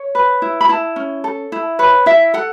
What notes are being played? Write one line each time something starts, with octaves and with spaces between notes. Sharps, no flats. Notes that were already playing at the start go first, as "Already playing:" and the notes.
Already playing: C#5
B4
E4
B5
E4 A5
C#4
A4
E4
B4 C#5
E4 E5
A4 F#5